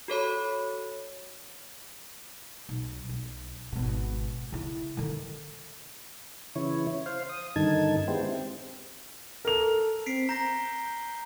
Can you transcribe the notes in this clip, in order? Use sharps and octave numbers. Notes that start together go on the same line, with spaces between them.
F#4 A4 C#5 B5
B1
B1
G#1 B2
C#3 E4
D3 D#3
C#3 E3 E4 C#5
C5 F5
D#6
G2 D3 D#3 D#4 A5 G#6
G#3 B3 E4 G4 C5
C4
A4 A#4 F7
C4 B6 C7 D7
A#5 G6 A#6